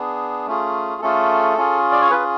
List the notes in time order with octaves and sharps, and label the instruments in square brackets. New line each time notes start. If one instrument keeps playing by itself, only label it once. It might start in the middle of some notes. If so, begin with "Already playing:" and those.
Already playing: [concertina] B3 D4 G#4
A3 C#4 F4 G#4
A3 C#4 F4 G#4 A4
C#4 F4 G#4
D5
C#5
C#4 F4 G#4 B4